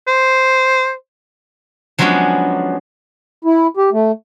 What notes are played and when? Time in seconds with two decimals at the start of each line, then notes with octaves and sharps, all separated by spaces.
0.07 C5
1.98 F3 F#3 G#3 B3 C#4 D4
3.45 E4
3.77 G4
3.92 A3